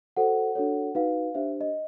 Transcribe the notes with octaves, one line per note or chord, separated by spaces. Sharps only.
F#4 A4 C5 F#5
D4 F#4 A4 C#5
D#4 F#4 B4 F5
D4 G4 C5 E5
D#5